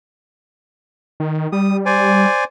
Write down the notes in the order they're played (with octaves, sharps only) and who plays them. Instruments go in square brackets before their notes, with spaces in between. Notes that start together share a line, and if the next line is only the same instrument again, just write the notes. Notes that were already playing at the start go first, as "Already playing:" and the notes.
[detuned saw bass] D#3
[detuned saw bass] G3 [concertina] D#6
[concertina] C5 D5 G#5